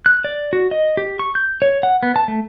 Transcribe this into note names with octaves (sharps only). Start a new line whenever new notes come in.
F#6
D5
F#4
D#5
G4
C#6
G6
C#5
F#5
B3
A5
A3